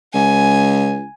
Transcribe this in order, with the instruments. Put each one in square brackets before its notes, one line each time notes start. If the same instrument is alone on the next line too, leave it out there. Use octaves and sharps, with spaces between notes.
[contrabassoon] C#2 [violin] G#5